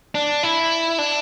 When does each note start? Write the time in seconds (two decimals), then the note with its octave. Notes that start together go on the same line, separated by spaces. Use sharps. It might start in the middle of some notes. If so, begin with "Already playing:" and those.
0.15 D4
0.43 E4
0.98 D4